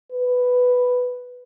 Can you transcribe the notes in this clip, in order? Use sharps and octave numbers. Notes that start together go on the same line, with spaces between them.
B4